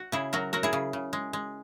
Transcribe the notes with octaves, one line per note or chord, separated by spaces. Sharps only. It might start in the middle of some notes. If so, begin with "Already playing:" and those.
Already playing: F#4
C#3 E4 G#4
F#3 F#4 A#4
F#3 F#4 A#4
E4 G#4
C#3
C#3
G#3
G#3